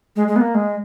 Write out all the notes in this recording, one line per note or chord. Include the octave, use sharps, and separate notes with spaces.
G#3
G#3
B3
A#3
G#3